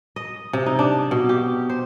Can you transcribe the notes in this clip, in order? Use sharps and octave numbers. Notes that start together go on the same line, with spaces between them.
D#5
C3
D#4
D4
B2
G4
C5